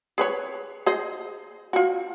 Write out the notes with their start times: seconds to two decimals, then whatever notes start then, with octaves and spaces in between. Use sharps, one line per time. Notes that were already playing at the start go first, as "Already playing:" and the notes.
0.18 G#4 B4 C#5
0.86 G#4 C5 D#5
1.73 F4 F#4